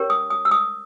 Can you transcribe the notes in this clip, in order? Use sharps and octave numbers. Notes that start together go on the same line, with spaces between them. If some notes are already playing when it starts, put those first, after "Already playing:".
Already playing: C#4 G4 A#4 C#5
D#6
D#6
E6
D#6